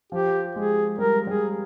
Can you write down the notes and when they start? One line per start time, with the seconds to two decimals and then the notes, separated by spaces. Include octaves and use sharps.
0.12 F3 G4
0.55 G#3 G#4
0.98 G3 A#4
1.27 G3 G#4